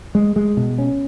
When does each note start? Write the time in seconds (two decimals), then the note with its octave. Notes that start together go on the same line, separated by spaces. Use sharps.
0.15 G#3
0.36 G#3
0.57 B2
0.78 C#4